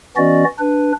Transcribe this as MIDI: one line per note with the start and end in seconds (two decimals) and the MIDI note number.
0.17 0.44 52
0.17 0.44 59
0.17 0.44 61
0.17 0.44 66
0.17 0.44 74
0.17 0.44 75
0.59 0.92 62
0.59 0.92 71